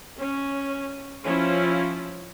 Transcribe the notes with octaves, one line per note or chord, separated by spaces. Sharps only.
C#4
F3 C#4 E4 F4